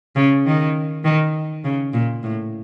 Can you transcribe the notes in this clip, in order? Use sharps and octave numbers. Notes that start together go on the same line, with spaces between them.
C#3
D#3
D#3
C#3
A#2
A2